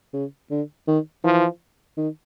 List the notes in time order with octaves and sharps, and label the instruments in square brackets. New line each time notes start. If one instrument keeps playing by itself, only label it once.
[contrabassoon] C#3
D3
D#3
[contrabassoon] E3 [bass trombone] F3
[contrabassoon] D#3